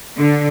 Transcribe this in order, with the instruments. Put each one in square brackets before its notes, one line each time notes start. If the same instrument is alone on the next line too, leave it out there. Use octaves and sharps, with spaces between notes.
[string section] D3